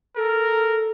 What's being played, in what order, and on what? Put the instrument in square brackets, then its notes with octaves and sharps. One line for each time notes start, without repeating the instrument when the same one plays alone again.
[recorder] A4 [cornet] A#4